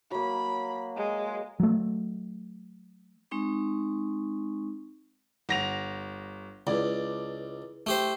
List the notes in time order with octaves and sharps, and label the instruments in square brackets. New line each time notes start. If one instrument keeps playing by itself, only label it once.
[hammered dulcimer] F#3 A#3 [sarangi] B5
[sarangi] G#3
[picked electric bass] F#3 A3
[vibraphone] G#3 C4 D#4 C#6
[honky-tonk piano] G1 A#6 F7 [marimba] F#5
[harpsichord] C#2 [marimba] E4 G#4 B4 [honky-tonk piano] D5
[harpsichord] A3 G4 C5